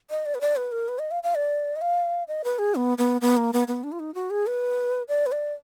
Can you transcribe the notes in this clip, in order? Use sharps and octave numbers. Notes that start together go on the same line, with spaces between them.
D#5
D5
B4
D5
B4
A#4
B4
D#5
F5
F5
D5
D#5
F5
D#5
B4
G#4
B3
B3
B3
A#3
B3
B3
D4
F4
D#4
F#4
G#4
B4
D5
B4
D5